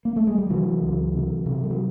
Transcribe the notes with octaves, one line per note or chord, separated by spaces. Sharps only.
A#3
A3
G#3
G3
C3 E3 F#3
C#2
C3
C3
G3
F#3